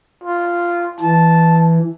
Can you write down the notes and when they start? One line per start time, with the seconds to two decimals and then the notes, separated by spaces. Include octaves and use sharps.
0.23 F4
1.00 E3 A5